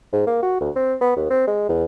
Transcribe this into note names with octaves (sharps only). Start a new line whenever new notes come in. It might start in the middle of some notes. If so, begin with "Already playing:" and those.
G#2
A#3
F#4
D2
C4
B3
D#2
C4
G#3
E2